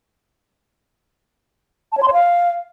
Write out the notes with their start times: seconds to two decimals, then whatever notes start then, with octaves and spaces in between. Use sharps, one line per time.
1.92 A5
1.97 C#5
2.03 C6
2.08 C#5
2.13 F5